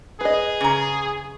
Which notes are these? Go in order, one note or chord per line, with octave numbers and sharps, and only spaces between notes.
G#4 B4 D#5
C#3 A#5